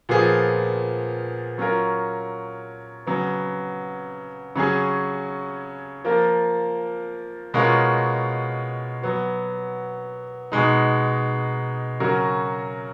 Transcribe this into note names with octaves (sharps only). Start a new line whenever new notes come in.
A#2 F3 B3 F4 G#4
F#3 C#4 F4 A#4
C#3 F#3 B3
C#3 F#3 C#4 G#4
F3 A#3 F4 A#4
B2 G#3 C#4 F4 A#4
F#3 B3 F#4
B2 G#3 D#4
C#3 F#3 C#4 F#4 A#4